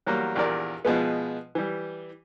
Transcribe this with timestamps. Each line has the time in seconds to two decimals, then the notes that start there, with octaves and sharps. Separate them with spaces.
0.07 E2 F#3 G3 A#3
0.36 A#1 E2 G4 A#4 D5
0.85 B2 F3 G#3 B3
1.55 E3 G3